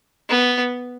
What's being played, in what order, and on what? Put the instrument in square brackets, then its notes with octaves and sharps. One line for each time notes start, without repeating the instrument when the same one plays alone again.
[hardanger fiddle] B3